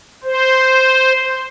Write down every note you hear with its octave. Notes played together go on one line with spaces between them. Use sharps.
C5